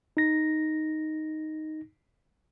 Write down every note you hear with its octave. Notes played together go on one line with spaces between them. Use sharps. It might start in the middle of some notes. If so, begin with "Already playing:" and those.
D#4 A#6